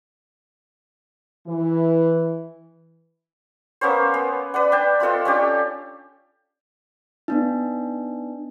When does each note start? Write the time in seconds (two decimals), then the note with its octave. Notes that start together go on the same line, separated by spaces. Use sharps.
1.47 E3
3.81 A#3 B3 C#4 C5
4.14 B3
4.54 B4 D5 F#5
4.72 D4 G5 A5
5.00 C4 F4 A4 D#5
5.25 C#4 D4 G4
7.28 B3 D4 D#4